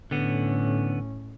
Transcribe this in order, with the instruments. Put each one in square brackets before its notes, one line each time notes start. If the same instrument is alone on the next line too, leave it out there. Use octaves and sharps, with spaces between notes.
[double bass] A2 C#4 [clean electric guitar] D3 B3